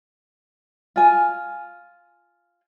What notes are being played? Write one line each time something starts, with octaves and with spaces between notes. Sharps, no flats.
F4 G#5